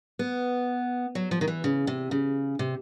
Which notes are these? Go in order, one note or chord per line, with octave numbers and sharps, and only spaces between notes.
B3
F#3
F3
D#3
E3
C#3
C3
C#3
C3